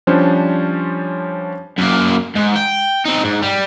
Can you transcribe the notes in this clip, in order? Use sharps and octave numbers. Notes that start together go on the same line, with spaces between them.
F3 G3 C#4 D4 C5
F#2 A#3
G#2
G5
C4 D#4
G#2
G3